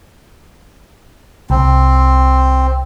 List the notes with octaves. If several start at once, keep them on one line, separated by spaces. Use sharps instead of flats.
C2 C4